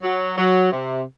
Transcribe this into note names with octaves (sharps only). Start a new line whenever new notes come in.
F#3
F#3
C3